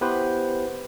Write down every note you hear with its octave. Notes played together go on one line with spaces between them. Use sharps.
B3 E4 G4 B4 C5